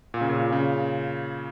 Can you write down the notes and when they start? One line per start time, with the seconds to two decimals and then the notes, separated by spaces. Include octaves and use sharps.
0.14 A#2
0.21 C#3
0.29 A#2
0.52 C#3